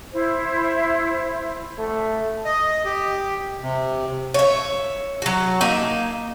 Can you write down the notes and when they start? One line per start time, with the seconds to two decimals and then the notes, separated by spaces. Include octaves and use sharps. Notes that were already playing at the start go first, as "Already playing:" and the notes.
0.13 E4 C5
1.79 A3
2.45 D#5
2.85 G4
3.62 C3
4.34 C#5 E5
5.22 F#3 F#4
5.61 A#3 D#4 E5